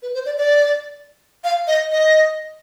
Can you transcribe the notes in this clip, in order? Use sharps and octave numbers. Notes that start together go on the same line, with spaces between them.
B4
C5
D5
D5
F5
D#5
D#5